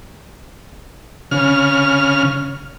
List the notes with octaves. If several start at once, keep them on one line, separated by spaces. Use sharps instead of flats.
C#3 F6